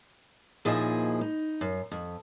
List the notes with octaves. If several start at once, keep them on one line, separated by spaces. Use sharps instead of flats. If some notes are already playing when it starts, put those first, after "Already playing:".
D#2 A#2 F3 E4 G#4 D#5
D#4
F#2
F2